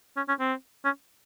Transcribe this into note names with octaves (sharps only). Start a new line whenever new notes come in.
C#4
C#4
C4
C#4